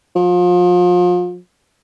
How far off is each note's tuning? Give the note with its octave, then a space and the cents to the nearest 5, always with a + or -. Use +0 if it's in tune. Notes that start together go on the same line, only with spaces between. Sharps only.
F3 +35